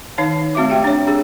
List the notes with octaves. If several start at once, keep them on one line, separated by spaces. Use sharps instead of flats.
D#3 D#4 C#5 F5 A5
A3 C4 F#4 E5 D6
G4 E5 G5
D4 C#5
D4 G#4